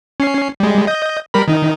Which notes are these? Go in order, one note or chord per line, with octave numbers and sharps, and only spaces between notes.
C#4 C7
G3 G#3
D#5 G6
G3 A#4 B5
D#3 D#4